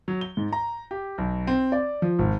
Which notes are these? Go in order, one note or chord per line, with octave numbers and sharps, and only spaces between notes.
F#3
G7
G#2
A#5
G4
B1
C4
D5
F3
G#1